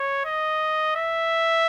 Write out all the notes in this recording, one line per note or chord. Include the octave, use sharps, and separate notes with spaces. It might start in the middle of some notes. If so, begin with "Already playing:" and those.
Already playing: C#5
D#5
E5